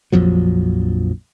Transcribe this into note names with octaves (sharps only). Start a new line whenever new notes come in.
A#1 F2 F3 F#3